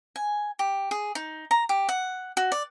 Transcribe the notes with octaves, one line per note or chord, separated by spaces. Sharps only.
G#5
G4
G#4
D#4
A#5
G4
F#5
F#4
D5